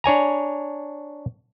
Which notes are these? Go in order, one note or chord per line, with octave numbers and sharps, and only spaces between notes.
D4 C#5 G#5 A#5